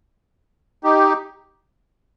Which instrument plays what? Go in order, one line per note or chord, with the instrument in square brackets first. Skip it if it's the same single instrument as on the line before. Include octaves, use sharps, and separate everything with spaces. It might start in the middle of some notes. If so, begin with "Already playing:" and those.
[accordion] D#4 G4